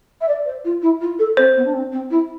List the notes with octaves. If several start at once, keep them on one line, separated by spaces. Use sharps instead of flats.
E5
D5
C5
F4
E4
F4
A4
C4 C5
B3
D4
C4
C4
E4